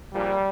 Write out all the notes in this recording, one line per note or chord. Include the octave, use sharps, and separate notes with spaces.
A#1 A#2 F3 G3